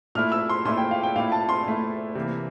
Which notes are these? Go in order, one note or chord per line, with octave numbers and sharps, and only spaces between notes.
A#2 A3 E4 F6
E6
C6
A#2 A3 E4 C6
G5
F5
G5
A#2 A3 E4 F5
A5
C6
A#2 A3 E4
C3 E3 A#3